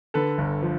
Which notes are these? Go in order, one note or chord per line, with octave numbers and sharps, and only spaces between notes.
D3 A4 B4
G1
F3